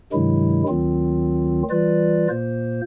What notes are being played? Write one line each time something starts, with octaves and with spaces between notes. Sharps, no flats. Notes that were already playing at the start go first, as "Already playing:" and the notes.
G2 C3 D#3 F#3 G#3 E4
D2 D#3 F#3 C4 F4
E3 G3 F4 B4 D5
A#2 A#3 C5